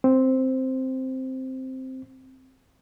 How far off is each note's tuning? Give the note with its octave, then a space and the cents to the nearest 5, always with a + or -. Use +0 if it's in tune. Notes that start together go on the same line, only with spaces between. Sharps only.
C4 +0